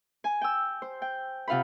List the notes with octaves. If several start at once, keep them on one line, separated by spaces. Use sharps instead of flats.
G#5
G5 E6
C5
G5
C3 F4 F5 F#5 B5